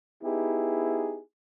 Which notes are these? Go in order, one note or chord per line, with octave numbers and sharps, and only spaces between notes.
B3 D#4 E4 G4 G#4